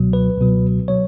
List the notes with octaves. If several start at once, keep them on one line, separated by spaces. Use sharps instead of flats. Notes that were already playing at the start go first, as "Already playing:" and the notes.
Already playing: C#2 B2 F#3
B4
C#2 B2 F#3
B2 F#3 C#5